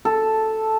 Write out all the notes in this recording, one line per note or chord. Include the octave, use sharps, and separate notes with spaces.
A4